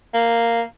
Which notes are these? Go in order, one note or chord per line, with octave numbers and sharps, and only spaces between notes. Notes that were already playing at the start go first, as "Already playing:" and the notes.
A#3